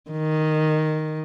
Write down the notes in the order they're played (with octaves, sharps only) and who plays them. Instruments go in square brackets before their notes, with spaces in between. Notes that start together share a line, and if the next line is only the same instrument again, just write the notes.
[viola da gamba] D#3